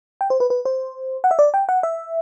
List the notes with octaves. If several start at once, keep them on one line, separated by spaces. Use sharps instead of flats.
G5
C5
B4
B4
C5
F#5
E5
D5
G5
F#5
E5